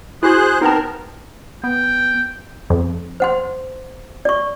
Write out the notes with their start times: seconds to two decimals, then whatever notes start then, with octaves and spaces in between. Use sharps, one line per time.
0.23 E4 F#4 G#4 C5 F#6
0.62 B3 C4 D#4 A#4 A5
1.64 B3 G5
2.70 F2
3.20 C5 F#5 C6
4.25 D5 C#6